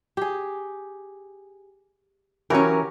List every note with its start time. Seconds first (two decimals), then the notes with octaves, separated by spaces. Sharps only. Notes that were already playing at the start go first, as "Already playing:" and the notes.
0.17 G4 G#4
2.50 E3 F#3 C#4 F#4 G4 A#4 C#5